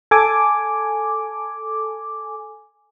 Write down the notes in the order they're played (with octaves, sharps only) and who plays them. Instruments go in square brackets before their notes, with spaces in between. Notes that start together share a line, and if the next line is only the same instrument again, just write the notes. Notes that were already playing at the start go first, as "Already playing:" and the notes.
[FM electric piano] A4 G#5 D6